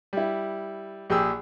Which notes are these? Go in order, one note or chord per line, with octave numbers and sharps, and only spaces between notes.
G3 E4
A#1 G4 G#4 E6